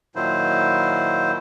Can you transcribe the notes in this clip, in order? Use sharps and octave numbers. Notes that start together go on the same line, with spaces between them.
A#2 D#3 F#3 E4 C5